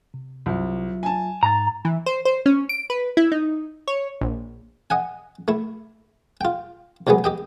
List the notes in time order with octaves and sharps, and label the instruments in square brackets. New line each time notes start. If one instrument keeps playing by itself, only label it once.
[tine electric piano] C3
[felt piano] C2 [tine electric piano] F#3 F4 E5
[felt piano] G#5 A5
[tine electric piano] G#2 A6 [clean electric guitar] A#5
[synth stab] E3
C5
C5
C#4
D7
B4
E4
D#4
C#5
A#1
[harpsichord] D#5 F#5 G#5
A3 E4
F4 G5
E2 C3 F#3 G#3 B3
G4 D#5 G5